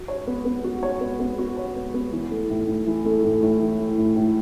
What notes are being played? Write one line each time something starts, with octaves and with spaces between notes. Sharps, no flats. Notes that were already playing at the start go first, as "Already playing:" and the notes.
Already playing: F#4
C#5
B3
B3
F#4
C#5
B3
B3
F#4
C#5
B3
B3
E3
A3
A2
A2
E3
A3
A2
A2
E3
A3
A2
A2